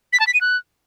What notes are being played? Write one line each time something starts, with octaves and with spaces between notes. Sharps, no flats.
B6
A5
B6
D#7
F#6